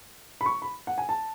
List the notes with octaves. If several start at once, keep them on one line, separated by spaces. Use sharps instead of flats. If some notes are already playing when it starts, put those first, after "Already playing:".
B5
C#6
B5
F#5
G#5
A5